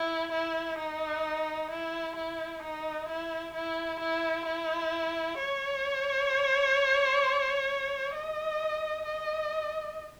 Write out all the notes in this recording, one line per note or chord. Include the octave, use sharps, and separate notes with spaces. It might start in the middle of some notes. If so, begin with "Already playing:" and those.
Already playing: E4
E4
D#4
E4
E4
D#4
E4
E4
E4
E4
C#5
D#5
D#5